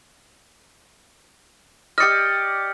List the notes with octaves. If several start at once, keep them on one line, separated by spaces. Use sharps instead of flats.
G4 D5 D#5 F6 C#7